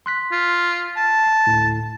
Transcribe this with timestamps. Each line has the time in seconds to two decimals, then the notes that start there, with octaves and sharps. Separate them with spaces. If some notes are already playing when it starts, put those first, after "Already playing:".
0.06 C6 F#6 B6
0.32 F4
0.97 A5
1.47 D2 A2